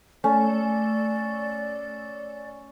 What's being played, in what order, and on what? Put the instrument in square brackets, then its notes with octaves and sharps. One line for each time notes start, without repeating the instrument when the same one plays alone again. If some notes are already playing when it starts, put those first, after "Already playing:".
[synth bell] A3 [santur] C#4 [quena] D5